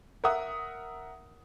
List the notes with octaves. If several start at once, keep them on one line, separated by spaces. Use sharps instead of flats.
A#4 E5 F#5 D#6